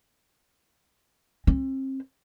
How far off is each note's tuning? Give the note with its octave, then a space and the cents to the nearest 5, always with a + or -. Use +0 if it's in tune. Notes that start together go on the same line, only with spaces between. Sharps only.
C4 +35